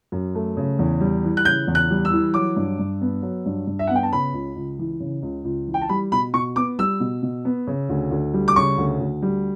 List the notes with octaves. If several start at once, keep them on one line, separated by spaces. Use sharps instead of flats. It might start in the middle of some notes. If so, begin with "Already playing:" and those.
F#2
A3
C#3
E2
G3
E3
F#6
C#3 G6
E2
F#6
G3
E6
E3
F#3 D6
G2
G2
B3
F#3
G2
G2
E5
B3 F#5
G5
A5
C#3 B5
C#2
C#2
E3
C#3
C#2
C#2
E3
G5
A5
G3 B5
B2 B5
B2 C#6
B3 D6
G3 E6
B2
B2
B3
C#3
D2
D2
G3
D6
C#3 C#6
D2
D2
G3